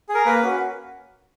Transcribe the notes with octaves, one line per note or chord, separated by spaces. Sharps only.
G#4
A#4
A#3 B4
C#4 F#4